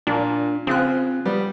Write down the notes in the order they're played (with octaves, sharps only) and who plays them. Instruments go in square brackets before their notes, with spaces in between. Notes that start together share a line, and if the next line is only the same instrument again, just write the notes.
[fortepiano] A#2 [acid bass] D4
[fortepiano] C#3 F4 F#6 [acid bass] C4
[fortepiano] G3 B3